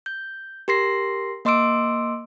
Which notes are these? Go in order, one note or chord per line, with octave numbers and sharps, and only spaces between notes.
G6
G4 A#4 C6 A#6 C7
A#3 D#5 C6 D6 E6 D7